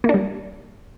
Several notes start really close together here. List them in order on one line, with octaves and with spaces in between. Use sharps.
A#3 D4 G3